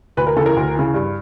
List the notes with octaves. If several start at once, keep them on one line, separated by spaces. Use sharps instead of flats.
D2 B4
A#4
C#3 E3 A4
A#4
D2
C#3 E3
G2